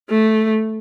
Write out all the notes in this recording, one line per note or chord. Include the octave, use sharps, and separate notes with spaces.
A3